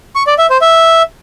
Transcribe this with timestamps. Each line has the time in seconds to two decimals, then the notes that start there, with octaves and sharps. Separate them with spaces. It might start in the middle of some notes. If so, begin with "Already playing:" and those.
0.16 C#6
0.27 D5
0.39 E5
0.50 C5
0.62 E5